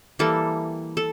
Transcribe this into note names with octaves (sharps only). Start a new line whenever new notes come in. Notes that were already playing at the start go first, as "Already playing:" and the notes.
E3 G3 A#3 A4
A4